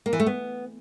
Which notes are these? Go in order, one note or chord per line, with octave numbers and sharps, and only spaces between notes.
A#3
E3
A3
B3